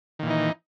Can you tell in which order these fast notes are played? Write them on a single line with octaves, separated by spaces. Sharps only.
D#3 A#2 E3 D#4